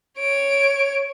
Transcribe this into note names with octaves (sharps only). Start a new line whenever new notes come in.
C#5 D7